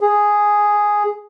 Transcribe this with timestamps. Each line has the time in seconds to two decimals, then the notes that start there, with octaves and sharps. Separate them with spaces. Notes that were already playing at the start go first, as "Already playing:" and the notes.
0.01 G#4